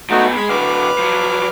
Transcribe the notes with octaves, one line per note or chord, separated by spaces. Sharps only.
F3 A3 B3 D#4 F#4
G#3 B5
D3 F#3 B4 D6 F6
F3 F#3